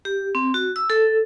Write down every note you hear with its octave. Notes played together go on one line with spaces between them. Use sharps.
G4
C4
F#4
E6
A4